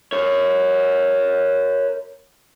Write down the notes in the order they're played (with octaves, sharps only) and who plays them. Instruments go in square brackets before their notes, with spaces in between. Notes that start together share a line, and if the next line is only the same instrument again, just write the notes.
[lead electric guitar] A#4 C#5